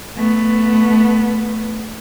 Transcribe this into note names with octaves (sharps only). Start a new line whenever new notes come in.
A3 B3